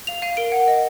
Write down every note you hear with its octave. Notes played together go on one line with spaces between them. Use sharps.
F5 F7
F5 D#7
A#4 D7
F#5
D#5